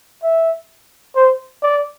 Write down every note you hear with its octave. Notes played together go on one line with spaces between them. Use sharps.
E5
C5
D5